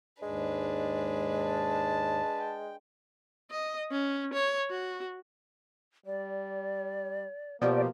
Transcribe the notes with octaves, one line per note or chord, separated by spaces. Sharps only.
D#2 G#2 G#3 D4 B4
A5
G5
D#5
C#4
C#5
F#4
G3 D5
B2 F3 A#3 G4 D5